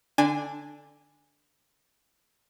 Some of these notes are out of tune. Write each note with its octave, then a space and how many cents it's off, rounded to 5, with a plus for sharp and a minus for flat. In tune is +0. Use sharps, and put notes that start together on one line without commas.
D3 +0 D4 +0 G#5 -15